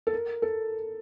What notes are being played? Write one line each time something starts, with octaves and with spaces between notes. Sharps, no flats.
A4
A#4
A4